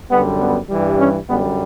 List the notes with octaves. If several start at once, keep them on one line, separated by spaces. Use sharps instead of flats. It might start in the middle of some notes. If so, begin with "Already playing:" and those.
F#2 D3 G3 B3
B3
G2 E3 G3
C#4
F#2 D3 G3 B3